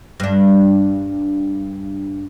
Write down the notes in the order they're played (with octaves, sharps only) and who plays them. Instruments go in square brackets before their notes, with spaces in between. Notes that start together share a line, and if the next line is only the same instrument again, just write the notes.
[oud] G2 D4